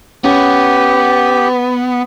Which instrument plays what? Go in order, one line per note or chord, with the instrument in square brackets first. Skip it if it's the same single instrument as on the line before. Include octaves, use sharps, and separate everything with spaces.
[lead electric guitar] B3 [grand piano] C#4 [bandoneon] G4